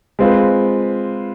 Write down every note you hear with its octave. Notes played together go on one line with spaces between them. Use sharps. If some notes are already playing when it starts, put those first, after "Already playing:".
G#3 C4 F4 B4